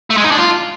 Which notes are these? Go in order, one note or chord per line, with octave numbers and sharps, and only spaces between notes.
A3
G#3
D#4
D4
F4